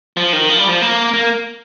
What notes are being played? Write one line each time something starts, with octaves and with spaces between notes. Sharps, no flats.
F3
D#3
F3
G3
F3
A#3
A#3